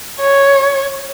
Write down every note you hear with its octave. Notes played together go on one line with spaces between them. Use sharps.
C#5